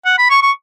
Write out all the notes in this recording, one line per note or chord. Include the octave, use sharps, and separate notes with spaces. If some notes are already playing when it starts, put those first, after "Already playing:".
F#5
B5
C#6
C#6